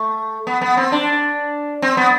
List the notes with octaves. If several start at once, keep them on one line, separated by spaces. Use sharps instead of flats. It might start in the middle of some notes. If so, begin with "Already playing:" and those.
Already playing: A3
B3
B3
C4
D4
C4
B3